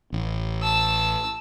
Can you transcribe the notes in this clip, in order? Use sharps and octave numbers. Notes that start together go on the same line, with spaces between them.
A1
A5 E6